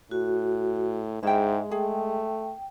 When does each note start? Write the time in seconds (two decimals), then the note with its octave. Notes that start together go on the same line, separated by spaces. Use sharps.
0.11 A2 F#4
1.23 G#2 G#3 E4 E5 G5
1.72 A3 G#4 G5